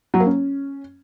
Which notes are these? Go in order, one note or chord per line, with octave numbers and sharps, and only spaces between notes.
F#3
A#3
C#4